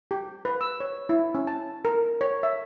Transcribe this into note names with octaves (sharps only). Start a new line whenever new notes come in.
G4
B4
E6
C#5
E4
C#4
A5
A#4
C#5
E5